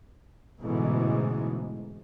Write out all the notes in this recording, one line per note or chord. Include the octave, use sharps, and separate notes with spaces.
A1 G#2 B2 D3 E3 G#3